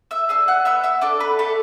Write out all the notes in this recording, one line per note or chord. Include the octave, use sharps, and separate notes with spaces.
E5 E6
D4 G#4 E5 E6
F#5 F#6
B3 E5 E6
E5 E6
D4 A4 D5 D6
B4 B5
A3 A4 A5